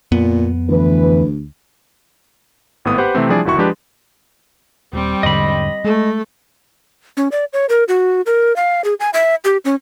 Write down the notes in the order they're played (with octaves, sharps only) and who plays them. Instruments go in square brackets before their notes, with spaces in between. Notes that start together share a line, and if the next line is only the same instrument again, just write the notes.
[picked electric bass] F2 B3 [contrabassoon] A#2
[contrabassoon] D2 [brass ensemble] E3 B4
[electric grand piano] G#1 A2 B3 D#6
G4 B4 C5 F#5
C3 E3 A3 C4
F3 G3 D4 E4 G#4 D5
G1 D#2 E4 F#4 C#6
F3 G#3 D4 G4 B4
[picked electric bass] D#1 [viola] G3 C4
[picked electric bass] E1 G#2 D3 [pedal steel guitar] D#5 B5
[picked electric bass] G#3 [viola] A3
[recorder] C#4
D5
C#5
A#4
F#4
A#4
F5
G#4
G#5
E5
G4
C#4